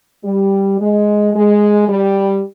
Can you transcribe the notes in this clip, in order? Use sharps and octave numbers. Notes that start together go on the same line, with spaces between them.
G3
G#3
G#3
G3